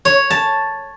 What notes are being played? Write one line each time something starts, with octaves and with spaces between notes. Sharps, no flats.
C#5
A5